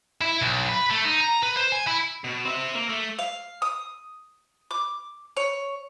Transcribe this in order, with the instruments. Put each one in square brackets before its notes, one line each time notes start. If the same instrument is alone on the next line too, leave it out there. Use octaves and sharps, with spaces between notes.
[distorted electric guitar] E4
B1
B4
A3
D#4
A#5
B4
C5
G#5
E4
[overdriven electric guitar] B2
C4 E5
A#3
A3
[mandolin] F5
D#6
D6
C#5